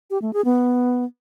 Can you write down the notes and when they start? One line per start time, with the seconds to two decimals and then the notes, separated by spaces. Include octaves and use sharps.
0.10 G4
0.22 A3
0.33 G#4
0.45 B3